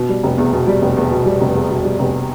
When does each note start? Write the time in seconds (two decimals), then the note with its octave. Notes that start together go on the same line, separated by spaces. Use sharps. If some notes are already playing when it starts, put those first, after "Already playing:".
Already playing: B2
0.09 G3
0.23 F1
0.38 E2
0.53 B2
0.67 G3
0.82 F1
0.97 E2
1.11 B2
1.26 G3
1.41 F1
1.55 E2
1.70 B2
1.85 G3
1.99 F1